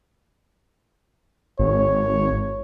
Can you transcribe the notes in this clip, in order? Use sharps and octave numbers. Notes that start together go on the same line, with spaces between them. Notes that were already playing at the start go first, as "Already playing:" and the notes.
G#1 C#5